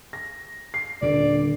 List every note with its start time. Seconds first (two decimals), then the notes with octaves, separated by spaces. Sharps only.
0.13 A#6
0.74 C7
1.01 D#1 D3 D5 D7